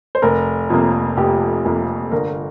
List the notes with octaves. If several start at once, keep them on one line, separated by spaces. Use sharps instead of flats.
C5
F1 A#4
F2 C3 A#3
F1 G4
F2 C3 A#3
G1 A#4